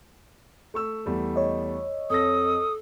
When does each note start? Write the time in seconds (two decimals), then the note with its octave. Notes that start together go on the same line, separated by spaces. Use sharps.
0.74 A3 C#6 E6
1.06 E2 G3 A3
1.36 C#5 D#5
2.10 F2 A4 D#6 A#6